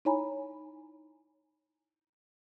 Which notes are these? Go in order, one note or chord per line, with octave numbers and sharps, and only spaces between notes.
D#4 E4 C#5 G#5 A#5 B5